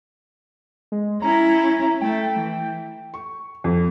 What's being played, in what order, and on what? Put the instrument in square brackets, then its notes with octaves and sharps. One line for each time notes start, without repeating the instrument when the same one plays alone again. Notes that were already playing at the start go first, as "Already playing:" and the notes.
[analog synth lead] G#3
[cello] C#4 E4 [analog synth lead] A#5
[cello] A3 [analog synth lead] G5
[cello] E3
[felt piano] C#6
F2